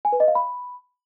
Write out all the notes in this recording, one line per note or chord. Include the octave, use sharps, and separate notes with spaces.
G#5
B4
D#5
F5
B5